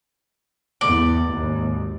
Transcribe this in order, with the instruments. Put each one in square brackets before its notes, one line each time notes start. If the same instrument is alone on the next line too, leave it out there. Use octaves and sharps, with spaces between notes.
[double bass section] E2 [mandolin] D5
[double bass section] G#1 D#2